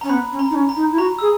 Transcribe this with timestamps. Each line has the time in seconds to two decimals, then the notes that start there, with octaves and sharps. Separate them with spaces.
0.01 C#4 A#5
0.09 B3 B5
0.32 C#4
0.39 A#5
0.50 D#4
0.55 C#4
0.69 A#5
0.76 D#4
0.91 E4
0.98 F#4 A#5
1.19 G#4 E6